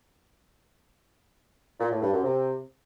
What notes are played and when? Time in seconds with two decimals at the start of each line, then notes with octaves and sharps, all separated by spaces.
1.79 A#2
1.90 A2
2.01 G2
2.12 F#2
2.23 C3